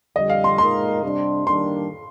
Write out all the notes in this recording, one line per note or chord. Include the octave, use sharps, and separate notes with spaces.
F2 D3 G3 D#5
F5
C6
A#2 G#3 D#4 A#4 C6
C3 G3 D4
D#3 G3 A#3 D4 C6